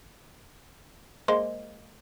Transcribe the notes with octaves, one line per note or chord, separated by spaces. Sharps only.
G#3 A#3 C5